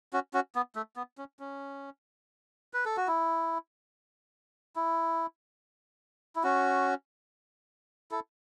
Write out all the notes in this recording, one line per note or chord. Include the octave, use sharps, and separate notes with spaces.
C#4 F#4
C#4 F#4
B3
A3
B3
C#4
C#4
B4
A4
F#4
E4
E4
E4
C#4 F#4
E4 A4